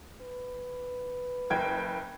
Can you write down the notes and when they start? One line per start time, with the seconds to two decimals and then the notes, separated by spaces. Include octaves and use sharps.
0.22 B4
1.50 F#1 G5 G#6